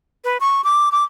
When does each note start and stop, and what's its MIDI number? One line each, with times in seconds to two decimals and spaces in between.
0.24 0.38 71
0.40 0.64 85
0.64 0.92 86
0.92 1.04 86